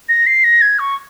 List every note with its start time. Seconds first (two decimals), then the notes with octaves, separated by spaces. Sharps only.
0.08 A#6
0.26 C7
0.43 A#6
0.61 G#6
0.78 C#6